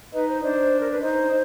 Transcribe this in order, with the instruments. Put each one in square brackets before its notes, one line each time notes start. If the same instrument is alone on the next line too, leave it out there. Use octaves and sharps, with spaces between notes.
[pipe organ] D#4 [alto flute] B4
[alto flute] C5
[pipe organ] D4 [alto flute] C5
[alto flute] A#4
B4
[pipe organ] D#4 [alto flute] C5